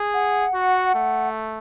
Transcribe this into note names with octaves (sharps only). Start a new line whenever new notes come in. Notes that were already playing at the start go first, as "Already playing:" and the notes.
Already playing: G#4
F#5
F#4
A3